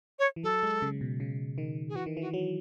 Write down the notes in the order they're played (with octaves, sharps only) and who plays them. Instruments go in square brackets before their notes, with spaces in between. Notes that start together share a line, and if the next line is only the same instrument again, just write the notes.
[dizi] C#5
[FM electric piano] E3
[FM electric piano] F#3 [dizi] A4
[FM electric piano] G#3
C#3
B2
C#3
D#3
[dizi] G#4
[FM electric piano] E3 [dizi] F#4
[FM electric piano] D#3
[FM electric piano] E3 [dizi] F#4
[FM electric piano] F#3